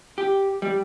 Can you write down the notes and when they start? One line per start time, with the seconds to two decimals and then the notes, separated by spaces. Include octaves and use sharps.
0.18 G4
0.62 G3